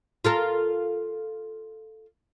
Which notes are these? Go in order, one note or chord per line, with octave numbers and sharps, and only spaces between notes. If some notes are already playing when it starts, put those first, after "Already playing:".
F4 A4 A#4